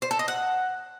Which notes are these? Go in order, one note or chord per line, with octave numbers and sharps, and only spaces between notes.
C5
A4
D#5
F#5